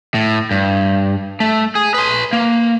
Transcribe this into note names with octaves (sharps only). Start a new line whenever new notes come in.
A2
G2
A3
G#4
B4 C6
A#3